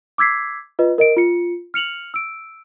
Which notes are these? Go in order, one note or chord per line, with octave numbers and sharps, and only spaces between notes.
D6 E6 G#6 B6 C7
F4 B4 D#5
A#4 D#5 D7
F4 C#7
F6 C#7 F7 F#7
E6 D7